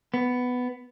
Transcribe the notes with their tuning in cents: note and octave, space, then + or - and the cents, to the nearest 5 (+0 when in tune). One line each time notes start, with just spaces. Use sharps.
B3 +10